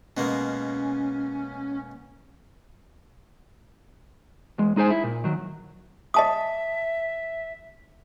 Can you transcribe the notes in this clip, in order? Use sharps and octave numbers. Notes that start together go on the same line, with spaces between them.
B2 G#3 A#3 C#4
E2 G#3
G#3 D#4 G#4 C5 G#5
E4
A#2
D#3 F#3
D#5 E5 A5 D#6